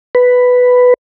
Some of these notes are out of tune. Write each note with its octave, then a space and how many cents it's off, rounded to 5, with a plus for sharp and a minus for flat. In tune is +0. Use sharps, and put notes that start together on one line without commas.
B4 +5